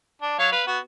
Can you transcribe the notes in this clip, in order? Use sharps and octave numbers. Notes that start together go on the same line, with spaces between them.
D4
F#3 C#5 F5
B4 F5
B3 F#4